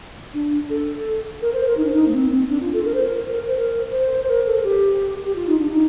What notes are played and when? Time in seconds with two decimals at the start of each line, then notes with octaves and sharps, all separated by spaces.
0.34 D4
0.70 A4
1.42 A#4
1.53 C5
1.66 A#4
1.77 D#4
1.85 D4
1.93 D#4
2.08 A#3
2.14 C4
2.31 C4
2.49 D4
2.61 F4
2.73 A4
2.85 A#4
2.94 C5
3.03 A#4
3.46 C5
3.56 A#4
3.92 C5
4.18 C5
4.28 A#4
4.46 A4
4.64 G4
5.25 G4
5.36 F4
5.47 D#4
5.59 D4
5.71 D#4